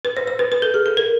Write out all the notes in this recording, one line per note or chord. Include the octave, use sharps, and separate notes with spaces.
B4
C5
C5
B4
B4
A4
G#4
A4
A#4